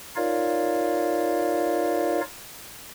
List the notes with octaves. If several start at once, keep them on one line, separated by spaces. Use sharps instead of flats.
D#4 F4 A#4 C#5 D5 F5